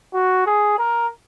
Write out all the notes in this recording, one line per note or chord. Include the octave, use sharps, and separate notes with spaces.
F#4
G#4
A#4